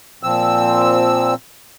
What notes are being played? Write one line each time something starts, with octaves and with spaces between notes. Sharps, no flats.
A#2 F3 C4 E6